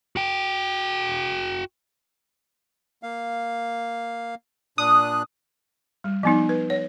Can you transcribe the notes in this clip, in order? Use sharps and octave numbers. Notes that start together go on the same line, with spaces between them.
F#4 G5
A#3 F5
A#2 D4 D#6 F#6
G3
F3 B3 D#4
B4
C#5